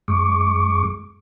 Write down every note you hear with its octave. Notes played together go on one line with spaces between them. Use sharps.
F#2 G#3 C#6 D6